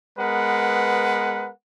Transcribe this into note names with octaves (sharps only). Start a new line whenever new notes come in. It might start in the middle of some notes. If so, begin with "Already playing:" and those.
G#3 B3 A#4 B4 F#5